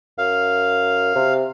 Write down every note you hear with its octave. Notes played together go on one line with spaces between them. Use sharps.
F#2 F5
C3